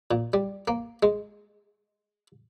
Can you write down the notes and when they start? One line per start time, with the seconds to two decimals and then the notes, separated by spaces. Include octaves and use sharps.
0.11 A#2
0.33 G3
0.68 A#3
1.03 G#3